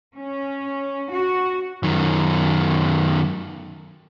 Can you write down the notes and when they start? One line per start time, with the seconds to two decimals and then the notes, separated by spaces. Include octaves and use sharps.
0.16 C#4
1.11 F#4
1.83 F#2 D#3